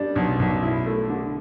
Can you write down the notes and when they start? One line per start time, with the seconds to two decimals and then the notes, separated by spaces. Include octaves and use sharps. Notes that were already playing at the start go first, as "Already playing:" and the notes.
Already playing: G3 D4
0.15 B1
0.39 B1
0.63 E4
0.86 A3
1.09 D3